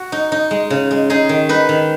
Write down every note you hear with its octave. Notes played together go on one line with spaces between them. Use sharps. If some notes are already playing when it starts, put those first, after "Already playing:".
Already playing: F#4
D#4
D#4
G#3
C#3
G#3
D#4 G#4
D#3
D#4 B4
D#3